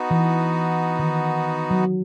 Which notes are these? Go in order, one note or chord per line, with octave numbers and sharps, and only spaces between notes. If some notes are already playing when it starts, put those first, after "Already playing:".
Already playing: B3 D#4 F#4
E3
D#3
F#3